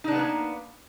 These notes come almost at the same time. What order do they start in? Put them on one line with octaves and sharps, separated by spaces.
D#4 D4 B3 B4 A#3